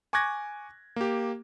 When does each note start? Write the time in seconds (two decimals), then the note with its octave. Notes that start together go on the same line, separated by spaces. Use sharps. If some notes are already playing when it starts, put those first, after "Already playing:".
0.13 G#5 C#6 D6 F#6 G#6 A#6
0.96 A#3 G4